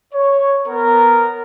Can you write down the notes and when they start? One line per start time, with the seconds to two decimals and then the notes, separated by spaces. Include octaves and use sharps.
0.13 C#5
0.67 B3 A#4